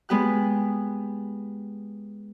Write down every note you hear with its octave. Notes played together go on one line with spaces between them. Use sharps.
G#3 B3 G4 F#6